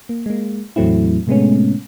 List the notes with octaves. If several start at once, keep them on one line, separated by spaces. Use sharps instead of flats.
A#3
G#3 A#3
E2 A2 F#3 A3 C4 E4
A2 C3 G#3 A3 B3 C#4